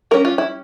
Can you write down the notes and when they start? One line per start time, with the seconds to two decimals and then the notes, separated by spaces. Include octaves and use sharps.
0.11 G3 C#4 A#4
0.25 F4
0.38 E4